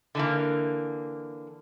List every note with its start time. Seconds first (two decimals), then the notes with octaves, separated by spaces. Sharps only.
0.15 D3 E3 A#3